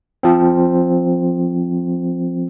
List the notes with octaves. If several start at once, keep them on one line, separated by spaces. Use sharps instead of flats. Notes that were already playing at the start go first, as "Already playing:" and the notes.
F3 C4